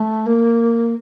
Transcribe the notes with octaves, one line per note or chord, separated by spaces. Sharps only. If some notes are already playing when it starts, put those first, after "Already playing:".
Already playing: A3
A#3